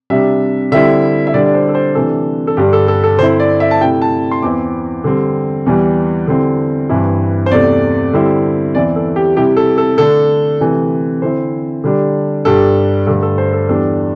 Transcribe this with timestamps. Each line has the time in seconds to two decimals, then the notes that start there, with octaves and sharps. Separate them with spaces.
0.10 C3 G3 D4 E5
0.72 D3 G3 C4 E4 E5
1.27 E5
1.34 D3 G3 D4 D5
1.46 D5
1.54 C5
1.69 A4
1.75 C5
1.95 C3 E3 A3 D4 A4
2.47 A4
2.57 G2 D3 G3 D4 G4
2.73 A4
2.88 A4
3.04 A4
3.19 D3 C4 E4 C5
3.40 D5
3.60 E5
3.71 A5
3.81 C3 A3 E4 G5
4.02 A5
4.31 C6
4.42 E2 E3 C4 E4 D6
5.04 D3 G3 C4
5.66 E2 E3 G3
6.27 D3 G3 C4 E4
6.89 G2 E3 C4 E4
7.46 C5
7.51 E2 C3 A3 D5
8.13 D3 G3 C4 E4
8.75 E2 E3 C4 E4 D5
8.96 A4
9.16 G4
9.36 C3 G3 E4 G4
9.57 A4
9.78 A4
9.98 D3 A3 D4 A4
10.60 C3 E3 A3
11.22 D3 C4 E4 C5
11.84 D3 G3 D4
12.45 G2 G3 D4 A4
13.07 G2 D3 A3 A4
13.22 A4
13.38 C5
13.53 A4
13.69 E2 E3 G3 D4 A4